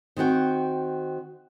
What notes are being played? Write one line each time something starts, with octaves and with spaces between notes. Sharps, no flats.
D#3 C4 F#4 G5